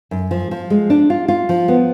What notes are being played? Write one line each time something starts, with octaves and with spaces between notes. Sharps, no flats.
F#2
F3
F3
G#3
D4
F4
F4
F3
B3